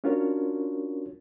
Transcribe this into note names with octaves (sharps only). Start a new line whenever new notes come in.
C#4 D4 F4 F#4 A#4 C#5